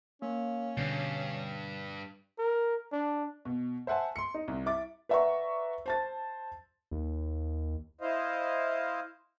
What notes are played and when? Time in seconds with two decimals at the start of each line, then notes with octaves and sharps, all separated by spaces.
0.22 A#3 C#4
0.77 G2 B2 D3 A6 C7
2.39 A#4
2.93 D4
3.45 B2
3.87 C5 E5 F#5 G#5 A5
4.16 C6 C#7
4.34 D#4
4.48 C2
4.66 E4 D6 A6
5.09 B4 D5 E5 F#5 A#5 C#6
5.86 C5 A5 A6
6.91 D#2
8.01 E4 C5 D#5 F5